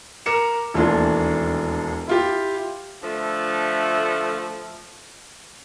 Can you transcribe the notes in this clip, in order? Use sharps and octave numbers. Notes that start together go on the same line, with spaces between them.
A#4 D6 C#7 E7
E1 D#2 E3 A3 D4 F4
E4 F4 G4
D3 F3 A3